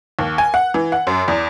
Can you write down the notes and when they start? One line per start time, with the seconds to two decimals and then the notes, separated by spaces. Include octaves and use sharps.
0.19 D#2
0.38 G#5
0.54 F#5
0.74 E3
0.92 F#5
1.07 F#2
1.28 E2